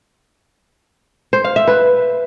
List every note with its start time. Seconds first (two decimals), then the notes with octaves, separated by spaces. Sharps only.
1.33 C5
1.44 F5
1.56 E5
1.68 B4